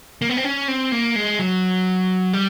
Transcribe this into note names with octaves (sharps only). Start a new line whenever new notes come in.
A#3
B3
C4
C#4
C4
A#3
G#3
F#3
G3